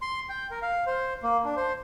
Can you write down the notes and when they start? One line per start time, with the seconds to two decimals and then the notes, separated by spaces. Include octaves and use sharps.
0.02 C6
0.29 G5
0.51 A#4
0.62 F5
0.86 C5
1.23 A#3
1.45 D4
1.56 C5